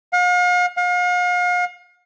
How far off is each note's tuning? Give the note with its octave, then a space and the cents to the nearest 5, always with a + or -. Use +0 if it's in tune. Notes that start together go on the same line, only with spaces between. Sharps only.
F5 +45
F5 +40